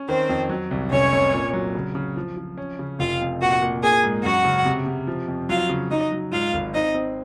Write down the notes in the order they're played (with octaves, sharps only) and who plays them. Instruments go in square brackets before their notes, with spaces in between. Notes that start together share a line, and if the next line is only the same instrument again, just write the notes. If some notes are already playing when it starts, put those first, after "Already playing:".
Already playing: [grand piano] C#4
[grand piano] D#3 [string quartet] C4 C5
[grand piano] F2
F#3
C2
[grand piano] F1 [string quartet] C#4 C#5
[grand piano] F1
A#2
F#3
C#3
C#3
F3
F3
C#4
C#3
[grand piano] F1 [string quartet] F4 F5
[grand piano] F2
[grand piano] A#2 [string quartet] F#4 F#5
[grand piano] A#2
[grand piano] A#3 [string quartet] G#4 G#5
[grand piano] G#2
[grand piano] F#2 [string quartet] F#4 F#5
[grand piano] C#3
C3
C3
F3
F2
[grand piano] F#3 [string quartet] F4 F5
[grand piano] C#3
[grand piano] F#3 [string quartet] D#4 D#5
[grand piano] F#3
[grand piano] G#2 [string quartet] F4 F5
[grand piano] G#1
[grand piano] C4 [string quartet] D#4 D#5
[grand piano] C4